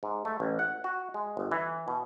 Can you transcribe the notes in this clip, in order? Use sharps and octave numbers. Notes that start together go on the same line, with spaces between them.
G#2
A3
A1
F#5
F#4
G#3
G1
E3
B2